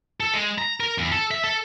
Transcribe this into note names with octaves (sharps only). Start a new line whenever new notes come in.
A4
G#3
A#5
A#4
E2
A4
E5
A4